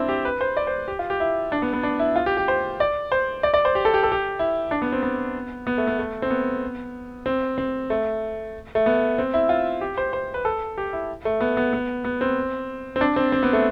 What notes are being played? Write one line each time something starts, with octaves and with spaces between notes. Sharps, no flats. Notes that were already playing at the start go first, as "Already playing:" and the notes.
Already playing: C4 D4 E4
G4
B4
C5
D5
C5
G4
F4
G4
E4
D4
B3
B3
D4
E4
F4
G4
G4
C5
D5
C5
D5
D5
C5
G4
A4
G4
A4
G4
E4
D4
B3
C4
B3
B3
A3
B3
A3
C4
B3
C4
C4
A3
A3
B3
C4
E4
F4
G4
C5
C5
B4
A4
G4
E4
A3
B3
B3
B3
B3
C4
C4
D4
C4
C4
B3
A3